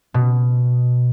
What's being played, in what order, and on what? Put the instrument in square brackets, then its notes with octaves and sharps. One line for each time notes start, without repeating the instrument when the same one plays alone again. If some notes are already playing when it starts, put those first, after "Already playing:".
[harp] B2